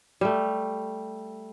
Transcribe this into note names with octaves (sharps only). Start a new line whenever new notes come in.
G3 A3